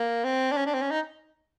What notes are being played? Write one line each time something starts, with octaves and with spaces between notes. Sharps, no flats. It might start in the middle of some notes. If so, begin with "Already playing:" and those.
Already playing: A#3
C4
D4
C#4
D4
C4
C#4
D#4